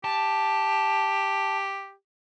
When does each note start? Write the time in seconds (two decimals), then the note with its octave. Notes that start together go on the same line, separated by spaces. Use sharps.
0.04 G4 A5